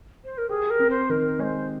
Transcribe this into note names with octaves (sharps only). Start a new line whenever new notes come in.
C5
A#4
G4 G#4
A#4
C4
C5
D#3 A#4
G#3 C5 C#5